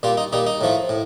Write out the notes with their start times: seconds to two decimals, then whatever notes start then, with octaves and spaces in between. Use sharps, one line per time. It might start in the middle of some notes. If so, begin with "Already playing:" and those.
0.03 A#2 G3 F4
0.17 D#4
0.33 A#2 G3 D#4
0.47 D#4
0.61 A2 F3 A3
0.89 A2